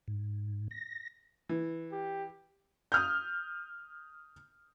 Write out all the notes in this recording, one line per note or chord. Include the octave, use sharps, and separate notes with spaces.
G#2
A#6
E3
G4
D#6 F6 G6